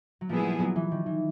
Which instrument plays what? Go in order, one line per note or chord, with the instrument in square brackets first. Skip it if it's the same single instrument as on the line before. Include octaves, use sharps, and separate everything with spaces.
[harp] F#3
[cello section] A#2 G3 B3 E4 G#4 [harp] F3
[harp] F3
F#3
E3
D#3
E3